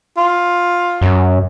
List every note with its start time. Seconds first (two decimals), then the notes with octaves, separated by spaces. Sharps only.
0.17 F4
1.02 F#2